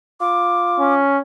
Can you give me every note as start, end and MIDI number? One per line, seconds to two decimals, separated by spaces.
0.21 1.00 65
0.21 0.94 86
0.79 1.19 61